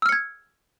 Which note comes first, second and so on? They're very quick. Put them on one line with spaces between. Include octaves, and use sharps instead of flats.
E6 F6 C#7 G#6